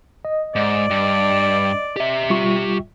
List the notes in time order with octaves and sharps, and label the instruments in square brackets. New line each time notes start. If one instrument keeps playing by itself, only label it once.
[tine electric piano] D#5
[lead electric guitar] G#2 [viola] D5
[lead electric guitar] G2
G4 E5
[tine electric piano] G3 F4 C#6